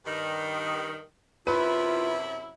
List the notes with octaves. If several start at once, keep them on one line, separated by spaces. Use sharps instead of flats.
G2 D#3
F#2 C3 E4 F4 B4